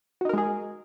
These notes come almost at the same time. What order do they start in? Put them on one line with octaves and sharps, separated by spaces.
F#4 D#4 A#4 G#3 G#4